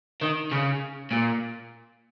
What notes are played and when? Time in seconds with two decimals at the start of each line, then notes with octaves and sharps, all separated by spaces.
0.22 D#3
0.52 C#3
1.11 A#2